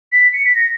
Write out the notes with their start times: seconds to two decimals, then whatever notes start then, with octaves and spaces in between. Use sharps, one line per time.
0.12 B6
0.33 C#7
0.44 B6
0.55 A#6